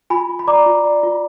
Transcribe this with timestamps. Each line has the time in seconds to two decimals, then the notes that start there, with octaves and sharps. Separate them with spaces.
0.10 F4 G#5 B5
0.29 F4
0.39 B5
0.48 D5 A#5 D6
0.66 F4
0.85 D5
1.03 F4